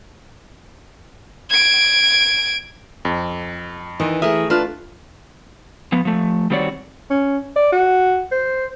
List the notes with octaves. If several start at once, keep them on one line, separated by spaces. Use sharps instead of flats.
G#6 D7
F2
D#3 E3
A3 G#4 A#4 E5
D4 F4 B4 A5 F6
F3 B3
F3 A3
D#3 G3 C4 F#4 C#5 D5
C#4
D5
F#4
C5